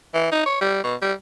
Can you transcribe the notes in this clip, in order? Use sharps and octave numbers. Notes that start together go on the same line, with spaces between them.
E3
D#4
C#5
G3
B2
G3